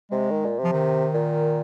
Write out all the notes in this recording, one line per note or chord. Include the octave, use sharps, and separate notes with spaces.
C3 G#3
D#3
A#2
C3
F3
D#3
A#2